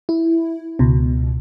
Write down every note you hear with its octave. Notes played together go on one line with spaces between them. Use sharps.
E4
C#2 B2